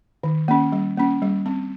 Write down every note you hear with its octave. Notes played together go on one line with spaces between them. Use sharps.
D#3
A#3 C#4
G3
A#3 C#4
G3
C4